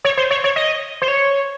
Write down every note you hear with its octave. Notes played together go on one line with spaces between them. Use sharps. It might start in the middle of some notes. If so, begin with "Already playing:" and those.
C#5
C5
C#5
C#5
D#5
C5
C#5